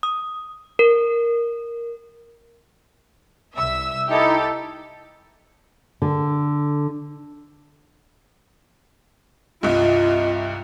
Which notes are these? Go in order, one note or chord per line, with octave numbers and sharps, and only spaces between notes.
D#6
A#4
C2 E5 E6
D#4 E4 G4 A4
D3
C2 G2 F4 D#5